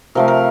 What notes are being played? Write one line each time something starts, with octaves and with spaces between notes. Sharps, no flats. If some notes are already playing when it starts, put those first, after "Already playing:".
C3 F3 A3 A#4
A#4